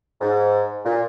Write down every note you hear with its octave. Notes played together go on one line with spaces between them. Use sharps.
G#2
A#2